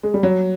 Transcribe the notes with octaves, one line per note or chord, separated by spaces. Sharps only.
G#3
G3
F#3